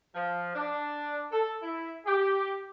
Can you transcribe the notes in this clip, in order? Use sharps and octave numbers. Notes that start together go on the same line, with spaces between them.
F3
D4
A4
E4
G4